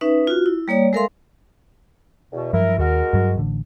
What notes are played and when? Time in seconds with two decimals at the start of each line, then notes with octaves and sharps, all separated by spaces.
0.01 C#4 D#4 B4 E5
0.27 F4 F#4
0.46 E4
0.68 G3 A#3 C#5 D5
0.93 G#3 A4 A#4 E5 F5 C6
2.32 E2 B2
2.53 G2 F3 F#3 E4 A#4
2.79 D#2 G#3 F#4 A#4
3.13 G2 F#3
3.38 A1 D3